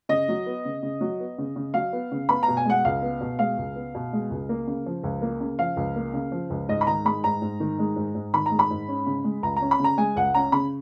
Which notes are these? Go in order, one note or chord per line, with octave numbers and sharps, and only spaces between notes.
C#3 D#5
F#3
B3
C#3
C#3
F#3
B3
C#3
C#3
F#3 F5
B3
C#3
B3 B5
A#5
B2
G#5
G#3 F#5
C#2 F5
B3
B2
G#3 F5
C#2
B3
B2
G#3
C#2
A#3
C#3
F3
C#2
A#3
C#3
F3 F5
C#2
A#3
C#3
F3
C#2
G#2 D#5
B5
D#3 A#5
G#3 B5
G#2 A#5
G#2
D#3
G#3
G#2
G#2
D#3 B5
A#5
G#3
B5
G#2
C#4
C#3
G#3
C#2 A#5
A#5
C#4
B5
C#3 A#5
G#3 G#5
C#2 F#5
C#4 A#5
C#3 B5